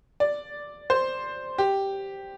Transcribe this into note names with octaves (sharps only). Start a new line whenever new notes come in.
D5
C5
G4